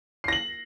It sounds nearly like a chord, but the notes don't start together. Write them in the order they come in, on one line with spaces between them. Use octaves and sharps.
C7 A#6 F#7